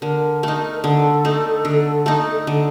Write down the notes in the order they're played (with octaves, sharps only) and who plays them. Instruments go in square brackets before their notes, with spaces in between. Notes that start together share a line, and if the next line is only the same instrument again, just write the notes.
[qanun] D3 [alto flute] A#4
[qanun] A3 D#4
[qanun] D3 [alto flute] A4
[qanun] A3 D#4
D3
A3 D#4
[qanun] D3 [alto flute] A4